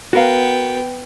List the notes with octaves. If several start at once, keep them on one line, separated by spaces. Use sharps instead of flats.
B3 F#4 A#4 F5 G5